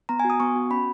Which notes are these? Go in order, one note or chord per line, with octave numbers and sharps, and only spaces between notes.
B3 A#5
G#5
F#4
D#6
B3 C#6
F#4
C#4 B5